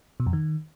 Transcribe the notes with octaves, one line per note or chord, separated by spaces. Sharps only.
B2
F2
D#3